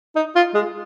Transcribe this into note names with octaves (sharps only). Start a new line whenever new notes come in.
D#4
F4
G#3